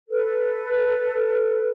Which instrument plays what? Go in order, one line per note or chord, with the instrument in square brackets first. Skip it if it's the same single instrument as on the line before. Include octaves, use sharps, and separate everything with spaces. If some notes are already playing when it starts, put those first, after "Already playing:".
[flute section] A4 B4